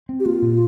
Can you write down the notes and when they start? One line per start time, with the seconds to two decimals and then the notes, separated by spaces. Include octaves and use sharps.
0.09 C4
0.20 G4
0.25 A#3 F4
0.42 A#2